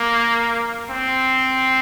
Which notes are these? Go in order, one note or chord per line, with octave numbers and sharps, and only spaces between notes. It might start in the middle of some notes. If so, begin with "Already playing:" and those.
Already playing: A#3
C4